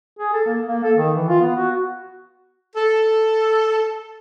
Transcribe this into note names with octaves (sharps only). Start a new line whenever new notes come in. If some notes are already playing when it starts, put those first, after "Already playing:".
G#4
A4
A#3
A#3
A4
D#3
E3
F4
B3
F#4
A4